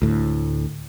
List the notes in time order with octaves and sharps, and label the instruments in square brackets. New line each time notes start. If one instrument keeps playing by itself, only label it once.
[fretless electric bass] D2 A2